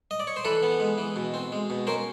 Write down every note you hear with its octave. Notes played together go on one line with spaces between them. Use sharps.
D#5
D5
C#5
C5
E3 A4 B4
B3
G#3
E3
B2
C4
G#3
B2
C#4 A#4 C5